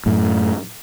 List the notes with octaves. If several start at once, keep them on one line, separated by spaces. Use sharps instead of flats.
F#2 A2